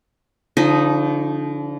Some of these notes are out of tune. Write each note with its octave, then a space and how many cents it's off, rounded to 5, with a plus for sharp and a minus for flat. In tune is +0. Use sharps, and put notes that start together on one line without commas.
D3 -35 F3 -10 D#4 +0